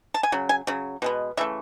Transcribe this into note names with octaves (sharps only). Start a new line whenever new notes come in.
A5
G#5
C#3 F#3
G#5
C#3 F#3
B2 G#3 B3
C#3 E3 A3 E5